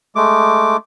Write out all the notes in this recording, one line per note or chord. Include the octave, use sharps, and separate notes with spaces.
G#3 A3 D6